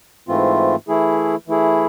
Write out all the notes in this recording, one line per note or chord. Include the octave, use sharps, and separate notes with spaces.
G#2 E3 A3 C4 F4
E3 A3 E4 G#4
E3 A3 E4 G#4